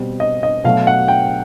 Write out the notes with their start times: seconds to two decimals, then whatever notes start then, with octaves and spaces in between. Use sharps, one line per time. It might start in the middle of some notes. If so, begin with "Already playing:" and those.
Already playing: B2 G3 C4
0.20 D#5
0.43 D#5
0.64 B2 F#3 A3 F5
0.87 F#5
1.08 G5